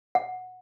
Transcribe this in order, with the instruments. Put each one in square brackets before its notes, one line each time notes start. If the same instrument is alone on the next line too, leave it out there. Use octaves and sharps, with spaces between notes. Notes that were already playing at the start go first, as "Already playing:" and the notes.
[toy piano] F#5